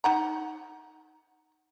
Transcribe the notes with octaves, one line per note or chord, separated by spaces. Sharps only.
D#4 F#5 A#5